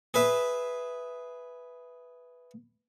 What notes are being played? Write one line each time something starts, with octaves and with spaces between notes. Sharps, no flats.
G#4 B4 E5